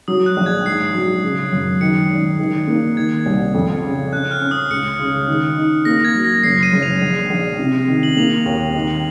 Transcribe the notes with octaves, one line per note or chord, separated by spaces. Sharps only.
F#3 D#6
F#6
A#1
G#6
G#2 C7
F#3
C#3
F#2
D#3 C#7
G#1
D#3
A#3
D#3 G#6
C2
F2
C#3
C#4 F#6
F6
C#4
D#6
C#2 C#7
C#3
D#3
D#4
A#3 A#6
G#6
F#3
A#6
F#1 C7
D#7
F#1
F7
A#1
A#1
C3
D#3
F#7
A#3 F7
D#2
D#3